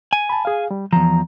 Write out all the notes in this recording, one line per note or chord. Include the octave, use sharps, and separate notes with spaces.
G#5
A5 B5
G#4 F5
G3
E2 F3 A#5